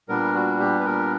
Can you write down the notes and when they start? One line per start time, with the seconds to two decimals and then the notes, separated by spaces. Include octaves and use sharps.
0.09 A#2 G3 B3 D4 A#4
0.34 F#4
0.60 G4
0.79 B4
0.85 A#4